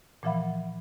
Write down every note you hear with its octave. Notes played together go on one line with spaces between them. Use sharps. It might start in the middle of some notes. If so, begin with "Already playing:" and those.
A#2 E3 F3 E5 F#5 B5